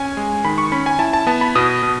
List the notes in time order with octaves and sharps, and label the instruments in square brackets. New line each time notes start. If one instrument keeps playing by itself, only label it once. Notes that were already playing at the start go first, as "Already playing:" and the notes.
Already playing: [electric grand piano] C#4 G#5
G#3
D#3 B5
C#6
C#4 B5
G#5
E4 A5
A5
B3 A5
B5
B2 D#6
B2